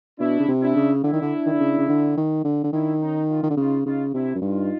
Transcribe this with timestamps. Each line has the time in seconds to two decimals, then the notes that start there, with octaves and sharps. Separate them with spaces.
0.19 B2 D4 E4
0.40 C#3
0.48 C3
0.62 D4 E4
0.77 C#3
1.04 D3 D4 E4
1.13 D#3
1.22 D3
1.46 D#3
1.53 D3
1.60 C#3
1.79 C#3
1.89 D3
2.17 D#3
2.45 D3
2.64 D3
2.73 D#3 D4 E4
3.01 C#4 D#4
3.29 D#4 F4
3.43 D#3
3.50 D3
3.57 C#3 D#4 F4
3.86 C#3 D#4 F4
4.14 C3 D4 E4
4.35 F#2
4.42 G2 D#4 F4